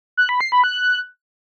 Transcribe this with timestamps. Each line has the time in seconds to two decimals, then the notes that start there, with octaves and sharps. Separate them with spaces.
0.17 F#6
0.29 B5
0.41 C7
0.52 B5
0.64 F#6